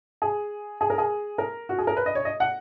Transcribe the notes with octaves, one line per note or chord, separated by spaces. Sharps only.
G#4
G#4
A#4
G#4
A#4
F#4
G#4
A#4
B4
D#5
C#5
D#5
F#5